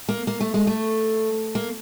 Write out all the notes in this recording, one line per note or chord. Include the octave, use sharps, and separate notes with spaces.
A#3
A#3
A3
G#3
A3
A#3